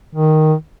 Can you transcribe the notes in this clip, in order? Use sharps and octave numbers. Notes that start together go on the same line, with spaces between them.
D#3